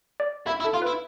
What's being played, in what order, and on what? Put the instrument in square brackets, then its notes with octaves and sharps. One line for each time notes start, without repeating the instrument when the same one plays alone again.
[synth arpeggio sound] D5
[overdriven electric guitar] E4
E4
[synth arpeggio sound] A4
[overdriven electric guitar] F4
[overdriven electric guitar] E4 [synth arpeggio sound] B4